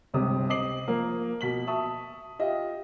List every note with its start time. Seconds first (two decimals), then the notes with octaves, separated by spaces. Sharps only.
0.14 G1 C#2 C3 D#6
0.49 C5 D#5 D6 D#6 C7 F#7
0.88 F3 A#3 A#4
1.41 B2 B6 F#7
1.67 E5 A5 C#6 D#6
2.39 F4 G4 D#5 E5